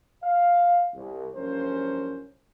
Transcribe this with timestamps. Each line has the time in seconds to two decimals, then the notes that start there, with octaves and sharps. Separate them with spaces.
0.22 F5
0.94 C2
1.34 F#1 G2 F3 C#4 A#4 C5